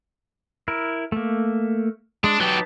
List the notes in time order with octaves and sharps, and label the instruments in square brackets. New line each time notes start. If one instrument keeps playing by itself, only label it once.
[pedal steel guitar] E4 A#4
A3 A#3
[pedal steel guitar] G#3 [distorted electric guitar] D4
[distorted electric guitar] F#3 G4 [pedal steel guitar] D#4 B4 A5